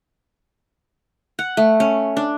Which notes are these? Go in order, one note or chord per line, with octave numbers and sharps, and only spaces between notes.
F#5
A3
C#4
D4